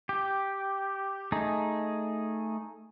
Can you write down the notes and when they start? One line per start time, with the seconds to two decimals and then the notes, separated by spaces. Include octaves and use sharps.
0.09 G4
1.32 A3 D#4 G#4